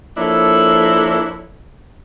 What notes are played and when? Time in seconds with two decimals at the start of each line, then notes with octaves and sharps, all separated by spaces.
0.17 F3 A#3 D4 E4 A4 C#5